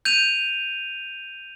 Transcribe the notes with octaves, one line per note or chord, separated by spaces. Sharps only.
G6 D#7 F7